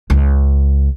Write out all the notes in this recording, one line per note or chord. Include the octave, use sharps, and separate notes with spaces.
C#2